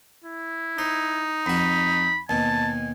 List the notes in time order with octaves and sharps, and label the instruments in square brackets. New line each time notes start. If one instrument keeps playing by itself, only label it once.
[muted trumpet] E4
[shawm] D#4 [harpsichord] C5
[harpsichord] F2 F#4 [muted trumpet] B5
[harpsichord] D#2 B2 [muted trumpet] G#5 [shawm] A5